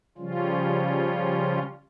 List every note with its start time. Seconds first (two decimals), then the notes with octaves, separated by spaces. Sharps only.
0.18 C#3 F3 G3 C#4 F4